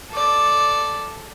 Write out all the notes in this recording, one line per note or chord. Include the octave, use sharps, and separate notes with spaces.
A4 D5